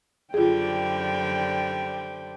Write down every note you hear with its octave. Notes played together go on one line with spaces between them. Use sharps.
F#2 D3 G3 F4 G#4 C5 G5